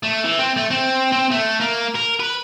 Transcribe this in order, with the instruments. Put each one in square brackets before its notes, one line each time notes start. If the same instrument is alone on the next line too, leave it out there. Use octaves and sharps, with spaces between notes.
[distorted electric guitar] A3
E3
C4
A3
C4
C4
A3
A#3
A#4
B4